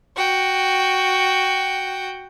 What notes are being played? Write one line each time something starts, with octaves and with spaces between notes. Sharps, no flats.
F#4 G5